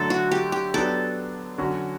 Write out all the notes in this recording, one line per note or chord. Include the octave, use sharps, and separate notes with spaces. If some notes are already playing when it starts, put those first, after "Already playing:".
Already playing: D3 F#3 A3 A4
F#4
G4
G4
F#3 B3 D4 A4
D3 F#3 C#4 F#4